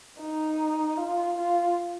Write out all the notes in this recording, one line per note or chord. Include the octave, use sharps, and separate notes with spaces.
D#4
F4
F4